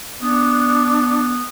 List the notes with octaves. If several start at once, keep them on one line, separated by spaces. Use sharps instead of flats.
B3 D4